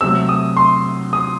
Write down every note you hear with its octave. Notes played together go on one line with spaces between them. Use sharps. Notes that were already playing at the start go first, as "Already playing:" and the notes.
C3 F#3 A3 E6
D#6
C6
D#6